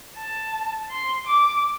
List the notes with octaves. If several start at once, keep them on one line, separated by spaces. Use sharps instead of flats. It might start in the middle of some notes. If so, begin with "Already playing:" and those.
A5
C6
D6